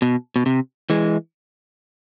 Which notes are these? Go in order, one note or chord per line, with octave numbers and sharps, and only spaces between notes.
B2
B2
C3
E3 G#3